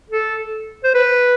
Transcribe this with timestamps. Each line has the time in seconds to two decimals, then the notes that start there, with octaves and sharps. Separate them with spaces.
0.10 A4
0.84 C5
0.95 B4